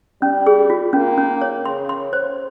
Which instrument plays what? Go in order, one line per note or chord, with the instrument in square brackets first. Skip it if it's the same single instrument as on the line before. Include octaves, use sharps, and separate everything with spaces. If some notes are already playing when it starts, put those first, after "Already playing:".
[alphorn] G3 [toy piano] C#4
[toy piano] G#4
F4
[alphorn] A#3 [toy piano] C#4
[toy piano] C#4
C#5
[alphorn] C#3 [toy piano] C6
[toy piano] C6
C5